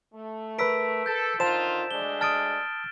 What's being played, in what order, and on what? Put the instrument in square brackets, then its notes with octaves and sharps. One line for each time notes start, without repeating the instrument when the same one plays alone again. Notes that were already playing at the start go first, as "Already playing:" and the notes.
[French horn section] A3
[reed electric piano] A#4 B4 [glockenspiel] E6 B6 D7
[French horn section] A4 [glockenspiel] G6 A6
[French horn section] D3 D#3 F4 [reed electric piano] C5 A5 [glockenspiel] E7
[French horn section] D2 G#3 D4 [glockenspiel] G7
[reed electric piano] A5 D#6 [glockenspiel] F6 A6 D7